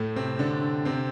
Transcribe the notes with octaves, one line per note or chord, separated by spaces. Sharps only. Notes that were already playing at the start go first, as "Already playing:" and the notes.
Already playing: A2 A3
C3 C4
D3 D4
C3 C4